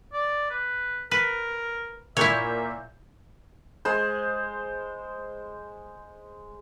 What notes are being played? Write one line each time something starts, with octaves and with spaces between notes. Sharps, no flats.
D5
B4
A#4 B4
A#2 E4 A#4 C#5 E5 G6
G#3 C5